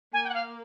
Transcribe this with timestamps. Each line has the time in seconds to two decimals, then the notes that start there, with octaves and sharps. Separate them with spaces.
0.13 A#3 G#5
0.24 G5
0.29 F#5
0.34 F5